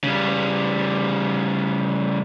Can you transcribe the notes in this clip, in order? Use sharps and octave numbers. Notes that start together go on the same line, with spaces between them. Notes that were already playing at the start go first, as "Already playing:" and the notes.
C#3 G3